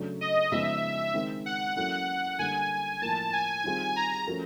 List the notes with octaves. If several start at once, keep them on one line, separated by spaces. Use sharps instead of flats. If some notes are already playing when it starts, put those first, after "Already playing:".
Already playing: C#3 F#3 A3 D4
D#5
C#3 F3 G#3 B3 D#4 E5
D#3 G#3 C4
F#5
F#3 A#3 C#4 E4 A4 F#5
D3 G3 A#3 G#5
A2 F3 A#3 A5
G#5
D#3 G3 C4 F4 G#4
A#5
F3 A3 C#4 F#4 A#4